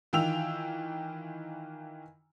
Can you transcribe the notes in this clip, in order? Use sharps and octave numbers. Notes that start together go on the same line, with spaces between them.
D#3 E3 F4 G5 E6 F7